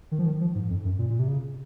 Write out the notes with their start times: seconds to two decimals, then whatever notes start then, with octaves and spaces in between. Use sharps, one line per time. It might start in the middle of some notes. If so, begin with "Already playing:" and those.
0.11 D#3
0.19 F3
0.26 D#3
0.41 F3
0.55 G#2
0.70 F2
0.85 F#2
0.99 A#2
1.10 A#2
1.19 C3
1.28 C#3